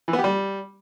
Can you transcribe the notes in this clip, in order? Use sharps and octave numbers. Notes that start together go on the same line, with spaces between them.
E3
B3
G4
G3